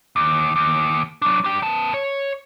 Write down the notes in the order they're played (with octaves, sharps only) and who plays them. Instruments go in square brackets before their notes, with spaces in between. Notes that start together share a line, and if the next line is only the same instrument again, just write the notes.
[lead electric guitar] D#2
D#2
F#3 D4
D4 G5
B3 A5
C#5